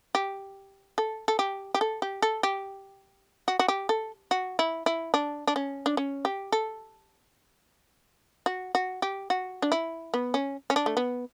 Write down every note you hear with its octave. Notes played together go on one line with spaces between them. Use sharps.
G4
A4
A4
G4
G4
A4
G4
A4
G4
F#4
F#4
G4
A4
F#4
E4
E4
D4
D4
C#4
D4
C#4
G4
A4
F#4
F#4
G4
F#4
D4
E4
B3
C#4
C#4
D4
A3
B3